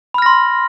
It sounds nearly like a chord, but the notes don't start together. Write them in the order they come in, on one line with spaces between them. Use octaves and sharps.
B5 F6 A#6 C6